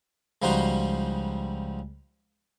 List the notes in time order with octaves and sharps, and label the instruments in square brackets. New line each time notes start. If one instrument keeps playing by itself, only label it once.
[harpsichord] C#2 F3 G3 D#4 F#4 C6